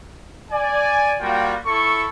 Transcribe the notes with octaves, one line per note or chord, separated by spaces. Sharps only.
D5 G#5
G3 A#3 F4 F#4 G5
E4 A4 C#6